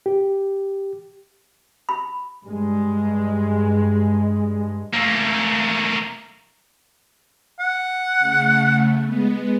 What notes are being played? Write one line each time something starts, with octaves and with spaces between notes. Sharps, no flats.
G4
B5
G2 G#3
A3 A#3
F#5
C#3 A3
G#3 B3